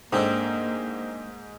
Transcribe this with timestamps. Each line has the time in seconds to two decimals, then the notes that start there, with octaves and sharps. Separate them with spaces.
0.12 G#2 A#3 C4 D4 A4